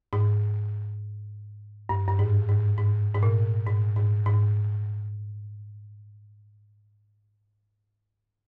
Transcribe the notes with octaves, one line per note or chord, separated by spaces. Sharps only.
G#2
G2
G2
G#2
G#2
G#2
G#2
A#2
G#2
G#2
G#2